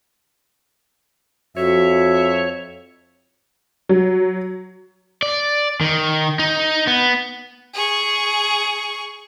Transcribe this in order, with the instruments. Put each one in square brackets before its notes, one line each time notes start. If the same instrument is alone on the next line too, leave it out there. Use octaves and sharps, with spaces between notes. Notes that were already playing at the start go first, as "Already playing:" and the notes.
[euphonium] F2 [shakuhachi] F#4 [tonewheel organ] C#5 [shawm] E5
[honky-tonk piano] F#3
[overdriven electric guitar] D5
D#3
D#4
B3
[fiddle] G#4 C#6